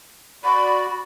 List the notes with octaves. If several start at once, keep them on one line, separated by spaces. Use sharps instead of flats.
F#4 D5 B5